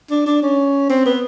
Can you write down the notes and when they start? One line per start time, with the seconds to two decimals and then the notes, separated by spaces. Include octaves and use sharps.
0.11 D4
0.26 D4
0.43 C#4
0.90 C4
1.06 B3